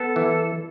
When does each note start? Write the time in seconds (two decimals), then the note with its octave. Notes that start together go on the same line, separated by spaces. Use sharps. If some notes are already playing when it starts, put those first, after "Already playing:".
Already playing: B3 A4
0.16 E3